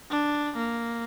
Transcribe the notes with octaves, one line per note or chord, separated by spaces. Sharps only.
D4
A#3